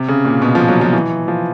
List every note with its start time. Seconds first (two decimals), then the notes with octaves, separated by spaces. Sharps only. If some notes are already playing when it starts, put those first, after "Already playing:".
Already playing: C3
0.08 C#3
0.25 A#2
0.42 B2
0.55 F3
0.68 F#3
0.81 F3
0.93 E3
1.28 F3